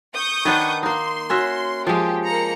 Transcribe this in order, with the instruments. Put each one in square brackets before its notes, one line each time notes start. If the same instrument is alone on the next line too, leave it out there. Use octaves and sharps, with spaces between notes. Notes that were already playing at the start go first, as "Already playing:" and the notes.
[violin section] C#6 D#6 G6
[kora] D#3 B3 D4
[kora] A#3 D#4 [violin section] C6
[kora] C#4 F#4 E5
[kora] F3 G#3 [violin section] G4
[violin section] A#3 A#5 C#7